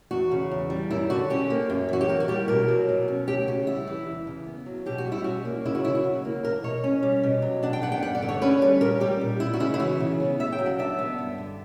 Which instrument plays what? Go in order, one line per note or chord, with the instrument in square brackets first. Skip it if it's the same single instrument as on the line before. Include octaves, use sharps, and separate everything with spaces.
[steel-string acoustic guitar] E2 F#4
C#3
E2
G3
F#2 E4
D3 F#4
C#4 G4
A#3
F#2
E3 F#4
G4
A#3 A#4
F#4
G3 G4
B2 A#4
F#3
B2
C#4
D2 G4
C#3 F#4
G3 E4
E3
E2
C#3
B3
F#3
B2 G4
F#4
G3
E4
C#4 F#4
A#3
C#3 E4
F#4
F#3 E4
F#4
C#3
A#3
E2 A#4
B2 C#5
C#4
G3
B2
F#3
D4 F#5
G5
B3 F#5
G5
G2 F#5
D5
D3
C#5
C#4 B4
G3 B4
A#2 A#4
G3 G4
A#2
B3 E4
F#4
C#3 E4
E4
E3 F#4
C#3
B3
C#3 E5
G5
F#3
F#5
D4 E5
B3
G2
D3